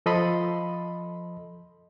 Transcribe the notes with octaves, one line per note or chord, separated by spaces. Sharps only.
F3 A4 D#5 B5 C6